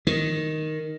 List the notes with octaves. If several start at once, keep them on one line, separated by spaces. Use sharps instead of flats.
D#3